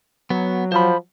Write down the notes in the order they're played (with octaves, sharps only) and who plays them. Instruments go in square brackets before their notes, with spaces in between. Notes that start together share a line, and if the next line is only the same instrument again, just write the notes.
[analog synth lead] F#3 [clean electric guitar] B3
[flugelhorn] F3 [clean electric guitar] C5 B5